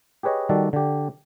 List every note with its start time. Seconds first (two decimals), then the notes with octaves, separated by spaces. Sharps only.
0.23 G4 G#4 B4 C#5 D#5
0.49 D#3 G3 F#4 A4 D5
0.73 D3 G4